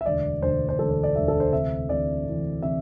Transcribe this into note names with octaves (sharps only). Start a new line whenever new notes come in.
E5
E1 D2 D3 D5
E1 D2 D3 C5
C5
E1 D2 D3 A4
C5
D5
E1 D2 D3 E5
A4
C5
D2 C3 E3 E5
D2 C3 E3 D5
D2 C3 E3
C3 E3 E5